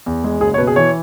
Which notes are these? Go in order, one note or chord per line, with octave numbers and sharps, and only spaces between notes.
E2
G#3
F#1 G#4
C#5
B2 B4
G#4
E3 C#5